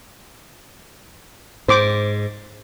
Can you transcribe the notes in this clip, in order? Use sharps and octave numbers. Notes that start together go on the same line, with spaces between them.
G#2 C5 D6